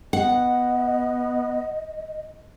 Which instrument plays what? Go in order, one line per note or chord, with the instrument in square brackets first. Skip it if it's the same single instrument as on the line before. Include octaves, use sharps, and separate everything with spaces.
[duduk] B3 [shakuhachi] D#5 [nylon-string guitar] F#5